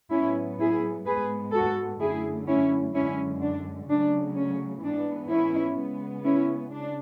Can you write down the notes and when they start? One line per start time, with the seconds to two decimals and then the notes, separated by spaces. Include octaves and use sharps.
0.11 A2 F#3 B3 C#4 E4
0.59 E4 G#4
1.06 G#2 G#3 B3 G#4 B4
1.53 F#4 A4
2.01 F#2 D3 A3 E4 G#4
2.47 C#4 E4
2.94 F#2 D3 G#3 C#4 E4
3.42 D4
3.89 C#3 F#3 A3 D4
4.35 C#4
4.83 G#2 E3 B3 D4
5.30 C#4 E4
5.77 C#3 G#3 B3
6.24 C#4 E4
6.72 C#3 D4